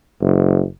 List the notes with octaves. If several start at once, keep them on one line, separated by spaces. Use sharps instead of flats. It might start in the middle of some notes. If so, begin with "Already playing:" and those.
F#1